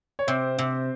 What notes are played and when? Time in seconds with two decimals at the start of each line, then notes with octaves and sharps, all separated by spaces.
0.19 C#5
0.27 C3 C4 C5
0.59 C3